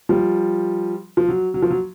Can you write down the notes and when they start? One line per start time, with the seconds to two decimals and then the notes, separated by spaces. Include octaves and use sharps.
0.09 F3 G3
1.17 F3
1.29 F#3
1.54 F#3
1.62 F3
1.71 F#3